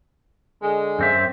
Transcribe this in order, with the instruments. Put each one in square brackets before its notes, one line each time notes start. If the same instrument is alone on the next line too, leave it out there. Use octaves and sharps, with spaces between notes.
[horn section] D3 G#3
[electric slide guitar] F#2 C4 E5